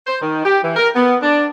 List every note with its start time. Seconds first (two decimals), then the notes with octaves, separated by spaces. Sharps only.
0.07 C5
0.21 D#3
0.45 G4
0.63 E3
0.76 A#4
0.95 B3
1.21 D4